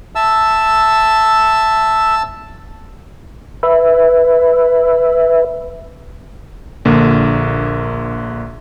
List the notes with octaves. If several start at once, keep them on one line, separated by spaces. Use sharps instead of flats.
E5 A5 E6
B4 E5
A#1 D3 A#3